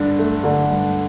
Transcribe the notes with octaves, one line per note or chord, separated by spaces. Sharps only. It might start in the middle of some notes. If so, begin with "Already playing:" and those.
Already playing: G2 D3 D4
A3
D3
G2